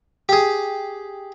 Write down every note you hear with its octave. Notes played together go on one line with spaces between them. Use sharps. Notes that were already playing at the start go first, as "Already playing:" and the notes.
G4 G#4